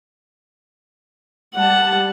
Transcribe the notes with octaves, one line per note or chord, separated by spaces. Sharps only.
G3 F#5 A5